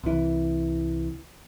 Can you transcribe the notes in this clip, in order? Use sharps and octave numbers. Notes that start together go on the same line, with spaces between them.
C2 E3